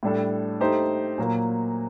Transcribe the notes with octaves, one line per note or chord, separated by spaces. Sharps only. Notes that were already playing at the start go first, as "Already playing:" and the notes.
A2 G3 D4 A4
A3 D#4 G4 C5
A#2 F#3 A#3